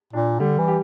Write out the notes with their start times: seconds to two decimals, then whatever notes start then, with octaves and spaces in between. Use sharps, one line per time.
0.13 A#2 D4
0.40 D3 G3
0.59 E3
0.68 G4